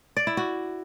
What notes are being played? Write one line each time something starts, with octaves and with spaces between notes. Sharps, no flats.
D5
E4
F#4